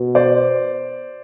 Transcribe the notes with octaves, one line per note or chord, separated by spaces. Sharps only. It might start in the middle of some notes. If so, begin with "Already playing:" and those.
Already playing: B2
C5 D5